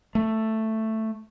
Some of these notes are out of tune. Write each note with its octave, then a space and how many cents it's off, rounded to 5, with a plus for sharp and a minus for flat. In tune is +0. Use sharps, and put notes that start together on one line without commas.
A3 +5